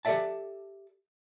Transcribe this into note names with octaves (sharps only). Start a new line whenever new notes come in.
G4 A4 A#4 D5 E5 A5